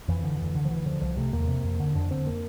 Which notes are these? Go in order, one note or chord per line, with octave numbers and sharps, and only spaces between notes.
F2 E3
D3
D2
D3
F3
D2 E3
D3 F3
C2 F3
C3 A3
E2 A#3
C3
F2
D3
F2 D4
D3 C4
A#3